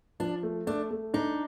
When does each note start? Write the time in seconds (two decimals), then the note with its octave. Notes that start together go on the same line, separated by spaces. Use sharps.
0.20 F3 D4
0.43 A3
0.67 A3 D4
0.91 A3
1.14 D4 D#4